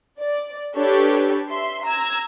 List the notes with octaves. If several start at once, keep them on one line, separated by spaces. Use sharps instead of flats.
D5
D4 G4 A4 B4 C#5
E5 C6
A#5 E6 G#6